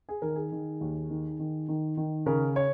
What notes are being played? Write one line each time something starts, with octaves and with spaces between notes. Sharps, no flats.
G#4
D#3 A#4
G#4
D#3
D#2
D#3
D#3
D#3
D#3
C#3 A#4
C#5